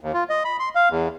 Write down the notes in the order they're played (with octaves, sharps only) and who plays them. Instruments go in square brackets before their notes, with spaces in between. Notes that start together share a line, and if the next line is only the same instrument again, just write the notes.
[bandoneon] D#2
F4
D#5
B5
C6
F5
E2